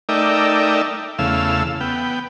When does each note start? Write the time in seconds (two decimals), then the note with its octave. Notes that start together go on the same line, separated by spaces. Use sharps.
0.09 A3 D#4 A#4 D5 E5 G5
1.19 E2 C#3 A3 F5 E6
1.80 B3 G5